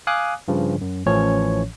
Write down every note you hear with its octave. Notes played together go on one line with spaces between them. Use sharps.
F5 G#5 D6 D#6 F#6
G2 C#3 F3
F#2
A1 A2 E3 F3 C#4 C#5